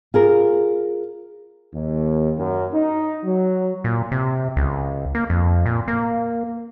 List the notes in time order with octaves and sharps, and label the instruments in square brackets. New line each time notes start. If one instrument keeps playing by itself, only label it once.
[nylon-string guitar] F4 G#4 A#4
[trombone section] D#2
F#2
D#4
F#3
[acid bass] A#2
C3
C#2
A#3
F2
A#2
A#3